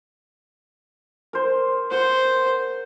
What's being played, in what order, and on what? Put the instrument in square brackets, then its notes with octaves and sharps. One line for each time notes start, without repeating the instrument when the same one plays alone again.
[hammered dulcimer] A#4 C5
[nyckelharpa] C5 [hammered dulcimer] F#5 C6